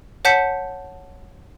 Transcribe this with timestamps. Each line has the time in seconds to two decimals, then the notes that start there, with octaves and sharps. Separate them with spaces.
0.25 C#5 F#5 A5 G6 B6 C#7